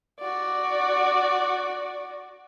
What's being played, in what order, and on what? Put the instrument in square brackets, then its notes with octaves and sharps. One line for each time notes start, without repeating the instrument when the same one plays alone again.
[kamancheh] F#4 D5